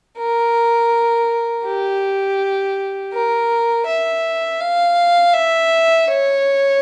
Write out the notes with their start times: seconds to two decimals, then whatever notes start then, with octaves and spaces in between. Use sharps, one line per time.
0.18 A#4
1.65 G4
3.13 A#4
3.86 E5
4.61 F5
5.34 E5
6.08 C#5